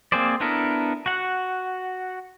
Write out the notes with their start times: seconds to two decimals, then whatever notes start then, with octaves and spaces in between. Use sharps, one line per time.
0.12 A#3 C4 G#4 C5 D5
0.40 B3 D4 E4 A4 A#4
1.06 F#4 F#5